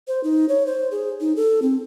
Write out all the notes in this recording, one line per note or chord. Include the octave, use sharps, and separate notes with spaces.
C5
D#4
C#5
C5
G#4
D#4
A4
C4